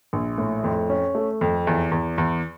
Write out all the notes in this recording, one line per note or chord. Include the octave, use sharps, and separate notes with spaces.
A#1
A2
F2
C#4
A3
F2
E2
E2
E2